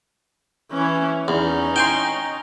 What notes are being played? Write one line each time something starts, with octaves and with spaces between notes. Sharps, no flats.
E3 C#4
E2 C#4 D#4
G5 G#5 C6